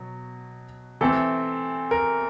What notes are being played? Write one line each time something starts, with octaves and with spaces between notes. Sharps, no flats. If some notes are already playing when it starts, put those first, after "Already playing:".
Already playing: B2 F#3
E3 A3 C4 A4
A#4